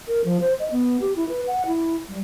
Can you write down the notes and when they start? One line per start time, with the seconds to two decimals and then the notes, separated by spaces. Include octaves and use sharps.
0.08 A#4
0.25 F3
0.41 C5
0.60 D#5
0.71 B3
1.01 G4
1.16 E4
1.29 B4
1.47 F#5
1.66 E4
2.09 G3